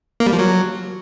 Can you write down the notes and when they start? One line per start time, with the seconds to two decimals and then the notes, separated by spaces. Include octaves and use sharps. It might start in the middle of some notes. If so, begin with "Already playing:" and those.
0.20 A#3
0.26 G3
0.33 F3
0.39 F#3